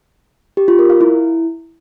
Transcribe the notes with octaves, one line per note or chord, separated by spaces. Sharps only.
G4
F4
A#4
F5
E4